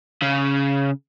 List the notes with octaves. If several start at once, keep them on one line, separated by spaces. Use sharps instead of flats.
C#3